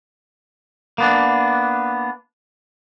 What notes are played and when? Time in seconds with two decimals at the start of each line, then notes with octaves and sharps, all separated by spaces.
0.98 A#3 B3 D4